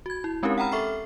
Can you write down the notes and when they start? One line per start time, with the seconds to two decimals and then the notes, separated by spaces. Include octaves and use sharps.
0.06 F#4 G#6
0.24 E4
0.43 G#3 C4 C#4 D#4 G4 A#4
0.58 F#5 G5 A#5 B5 F6
0.72 A4 E5 C#6 F6 C7